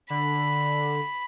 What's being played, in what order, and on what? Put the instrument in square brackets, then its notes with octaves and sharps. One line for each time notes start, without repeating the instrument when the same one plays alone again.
[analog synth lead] D3 [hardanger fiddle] B5